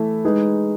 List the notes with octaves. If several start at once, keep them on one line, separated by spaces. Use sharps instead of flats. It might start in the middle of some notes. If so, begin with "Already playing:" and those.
Already playing: E3 A3 E4
G#3 D#4 G#4 B4